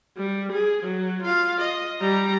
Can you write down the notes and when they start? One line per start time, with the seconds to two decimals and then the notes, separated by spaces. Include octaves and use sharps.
0.17 G3
0.53 G#4
0.83 F#3
1.23 F4 F5
1.60 D#5
2.01 G3 A#5